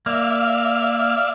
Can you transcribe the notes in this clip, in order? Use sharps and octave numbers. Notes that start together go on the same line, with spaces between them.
A#3 D5 E5 F5 F6